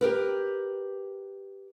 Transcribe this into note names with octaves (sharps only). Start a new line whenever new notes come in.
G4 A#4 B4